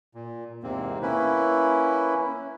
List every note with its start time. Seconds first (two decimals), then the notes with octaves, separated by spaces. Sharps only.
0.14 A#2
0.63 E2 G#2 C3 A#3 C4
1.02 A#3 C#4 E4 B4